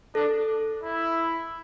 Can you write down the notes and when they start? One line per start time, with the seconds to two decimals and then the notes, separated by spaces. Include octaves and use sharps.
0.15 D4 A4
0.83 E4